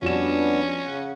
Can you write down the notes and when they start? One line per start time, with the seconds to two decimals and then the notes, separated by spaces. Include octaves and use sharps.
0.02 F2 G3 B3 C#4 D4 F#4 E7
0.84 C#3 F#5